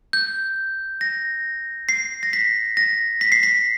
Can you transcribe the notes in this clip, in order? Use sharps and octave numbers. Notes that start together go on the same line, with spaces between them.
G6
A#6
C7
A#6
B6
A#6
B6
C7
B6